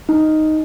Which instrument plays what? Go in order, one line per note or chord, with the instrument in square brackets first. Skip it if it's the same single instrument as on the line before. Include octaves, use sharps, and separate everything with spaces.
[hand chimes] D#4